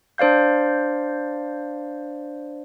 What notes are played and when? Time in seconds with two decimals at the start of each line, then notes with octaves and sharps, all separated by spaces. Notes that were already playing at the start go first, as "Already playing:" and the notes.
0.18 D4 C5 D5 F5 G6